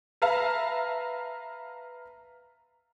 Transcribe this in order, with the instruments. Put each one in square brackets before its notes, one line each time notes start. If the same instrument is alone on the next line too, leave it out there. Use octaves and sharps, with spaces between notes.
[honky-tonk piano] B4 E5 F5 A5 A#5